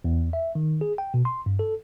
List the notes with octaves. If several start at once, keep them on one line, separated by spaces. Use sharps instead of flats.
E2
E5
D#3
G#4
G5
B2
C6
G2
A4